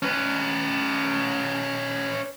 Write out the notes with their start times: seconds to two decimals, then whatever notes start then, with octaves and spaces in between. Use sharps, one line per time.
0.03 C#4 B4